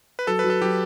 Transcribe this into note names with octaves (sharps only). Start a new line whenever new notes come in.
B4
F#3 A4
F#3 B4
A4
F#3 G4